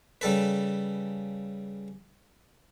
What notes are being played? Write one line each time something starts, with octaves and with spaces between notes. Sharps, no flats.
C#3 G3 A4 B4